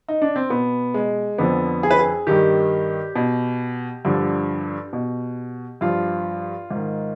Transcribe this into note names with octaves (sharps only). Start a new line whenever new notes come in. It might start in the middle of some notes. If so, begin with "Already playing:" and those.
D#4
D4
C4
B2 B3
G#3
F2 D3 F3 B3
G#4
B4
G#4
G2 D#3 G4
B2
G2 D3 F3
B2
G2 F3 F4
G#2 D#3